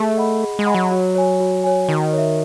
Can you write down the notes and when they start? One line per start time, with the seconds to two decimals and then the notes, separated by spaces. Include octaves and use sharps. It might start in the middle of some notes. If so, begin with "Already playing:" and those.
Already playing: A3 G#4
0.17 D#5 F#5 B5
0.42 G#4
0.59 G#3
0.66 D#5 F#5 B5
0.74 F#3
0.91 F#4
1.15 C#5 G#5
1.40 F#4
1.64 C#5 G#5
1.89 D#3 F#4
2.13 C#5 E5